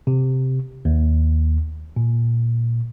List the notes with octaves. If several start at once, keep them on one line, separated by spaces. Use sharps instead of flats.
C3
D#2
A#2